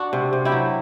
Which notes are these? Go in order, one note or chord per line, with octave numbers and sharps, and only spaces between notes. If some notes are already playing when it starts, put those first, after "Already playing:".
Already playing: D4 F#4
C3
C3
E4 G4
F#3